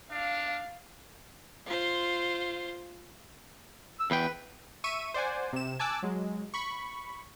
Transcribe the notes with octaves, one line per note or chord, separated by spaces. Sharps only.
D4 F5
F4 C5
E6
E2 B4 G5
E5 C#6 E6 D#7
C5 D5 F#5 G#5
C3 E7
G#5 A5 D6 E6 F#6
F#3 G#3
B5 C#6